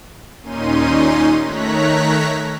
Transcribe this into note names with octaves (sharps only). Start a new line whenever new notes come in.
D#2 A#2 C#4 D#4 C6 D#7
D#3 A3 C#5 A#5 F#6 B6